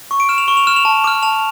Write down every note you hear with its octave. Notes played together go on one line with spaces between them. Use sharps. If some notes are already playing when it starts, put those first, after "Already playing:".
C#6
D7
F6 E7
F7
C#6 G7
F7
F6 E7
F7
A5
D6 F6
A5 F7